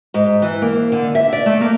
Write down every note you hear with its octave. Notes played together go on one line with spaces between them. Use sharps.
G#2
E3
A#3
D3
E5
D5
A3
A#3